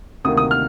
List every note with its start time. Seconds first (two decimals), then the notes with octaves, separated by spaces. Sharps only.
0.24 D2 C3 D#3 A#3 D#6
0.37 D#6
0.51 F6